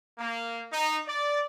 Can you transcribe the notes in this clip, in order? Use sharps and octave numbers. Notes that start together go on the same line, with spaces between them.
A#3
D#4
D5